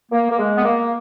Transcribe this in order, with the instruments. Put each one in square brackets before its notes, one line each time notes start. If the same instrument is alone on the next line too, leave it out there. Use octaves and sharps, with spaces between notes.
[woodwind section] A#3
A#3
G#3
B3
A#3